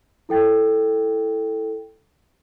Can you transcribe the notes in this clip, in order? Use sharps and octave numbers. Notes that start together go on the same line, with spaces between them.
E4 A4 G5 A6